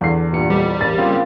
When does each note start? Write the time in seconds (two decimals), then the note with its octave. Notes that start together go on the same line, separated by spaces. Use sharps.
0.01 E2 D3 C7
0.33 G2 A#2 C#7
0.50 F2 G3
0.81 A1 D#2 A6
0.98 C#3 A#3 C4 F4